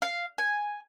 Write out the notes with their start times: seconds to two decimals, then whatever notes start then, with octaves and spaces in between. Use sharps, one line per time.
0.02 F5
0.38 G#5